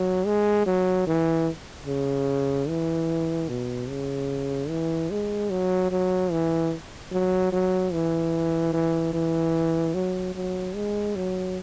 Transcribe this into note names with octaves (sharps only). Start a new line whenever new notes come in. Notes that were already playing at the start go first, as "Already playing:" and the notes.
Already playing: F#3
G#3
F#3
E3
C#3
E3
B2
C#3
E3
G#3
F#3
F#3
E3
F#3
F#3
E3
E3
E3
F#3
F#3
G#3
F#3